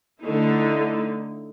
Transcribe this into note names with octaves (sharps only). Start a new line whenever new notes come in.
D3 A3 D#4 E4